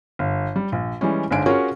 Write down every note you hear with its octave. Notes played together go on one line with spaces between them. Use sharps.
G1
G3
A#1
E3 G3 G#3 C#4
G1 G#2 D4 G#5 D7
C#4 F4 F#4 G#4 A#4 C#5